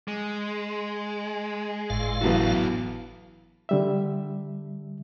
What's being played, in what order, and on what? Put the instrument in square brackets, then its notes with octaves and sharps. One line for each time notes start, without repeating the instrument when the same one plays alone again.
[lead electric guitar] G#3
[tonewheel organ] G1 A2 F5
[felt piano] E3 F#3 B3 [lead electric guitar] F#4 A4
[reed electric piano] D3 G3 E5